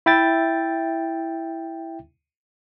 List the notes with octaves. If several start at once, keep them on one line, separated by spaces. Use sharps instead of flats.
E4 E5 G5 A6